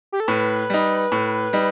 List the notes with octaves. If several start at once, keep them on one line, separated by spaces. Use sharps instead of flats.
G4
A4
A2 B4
G3 D#4
A2
G3 D#4